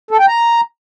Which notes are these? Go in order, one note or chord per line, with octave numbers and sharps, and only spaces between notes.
A4
G5
A#5